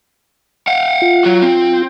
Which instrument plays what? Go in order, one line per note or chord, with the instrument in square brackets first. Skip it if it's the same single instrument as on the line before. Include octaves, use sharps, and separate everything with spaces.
[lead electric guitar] F5 F#5
[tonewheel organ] F4
[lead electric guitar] F#3 F#4
C4